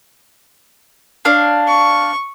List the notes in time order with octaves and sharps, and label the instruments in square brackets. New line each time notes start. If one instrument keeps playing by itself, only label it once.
[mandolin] D4 C#5 F5
[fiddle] C#6